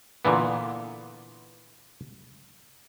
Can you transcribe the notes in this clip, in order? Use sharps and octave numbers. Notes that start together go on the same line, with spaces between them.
A#2 D3 E3 B3